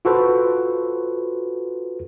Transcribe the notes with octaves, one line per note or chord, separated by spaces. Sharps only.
F4 F#4 A4 B4 C5